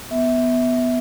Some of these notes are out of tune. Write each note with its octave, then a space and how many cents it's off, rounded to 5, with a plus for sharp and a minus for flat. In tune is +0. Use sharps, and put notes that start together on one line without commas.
B3 +0 E5 -15